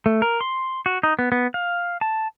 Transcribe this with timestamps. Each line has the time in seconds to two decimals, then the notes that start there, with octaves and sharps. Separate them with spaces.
0.06 A3
0.22 A#4
0.41 C6
0.86 F#4
1.03 D#4
1.19 B3
1.32 B3
1.54 F5
2.01 A5